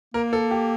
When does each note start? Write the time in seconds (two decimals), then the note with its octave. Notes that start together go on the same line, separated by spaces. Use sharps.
0.14 A#3 A#4
0.33 A4
0.51 G4